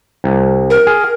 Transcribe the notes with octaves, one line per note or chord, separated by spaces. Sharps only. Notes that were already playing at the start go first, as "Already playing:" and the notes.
C2
A#4
G#4